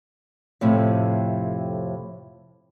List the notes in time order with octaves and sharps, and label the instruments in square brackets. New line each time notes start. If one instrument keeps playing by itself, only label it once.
[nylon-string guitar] F2 A2 C3